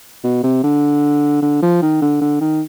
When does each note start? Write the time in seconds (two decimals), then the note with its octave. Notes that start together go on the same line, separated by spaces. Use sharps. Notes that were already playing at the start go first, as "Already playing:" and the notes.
0.24 B2
0.44 C3
0.63 D3
1.42 D3
1.63 F3
1.82 D#3
2.02 D3
2.21 D3
2.41 D#3